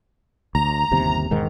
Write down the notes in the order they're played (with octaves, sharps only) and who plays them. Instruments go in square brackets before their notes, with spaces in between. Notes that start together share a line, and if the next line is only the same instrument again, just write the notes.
[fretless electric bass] D2 [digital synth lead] A#5
[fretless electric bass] G1 D#2 C3
E1 G#2 D#3